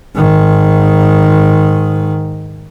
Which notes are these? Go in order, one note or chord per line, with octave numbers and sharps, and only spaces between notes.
G#2 D#3